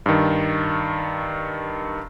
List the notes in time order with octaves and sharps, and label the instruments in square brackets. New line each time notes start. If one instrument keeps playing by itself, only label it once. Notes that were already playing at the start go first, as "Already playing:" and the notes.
[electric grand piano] G2 D#3